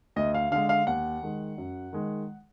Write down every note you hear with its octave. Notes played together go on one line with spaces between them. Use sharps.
D2 D#5
F5
D3 G#3 F5
F5
D#2 F#5
D#3 G#3
F#2
D#3 G#3